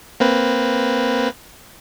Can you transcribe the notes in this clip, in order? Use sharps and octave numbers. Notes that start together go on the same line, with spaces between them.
A#3 C4 B4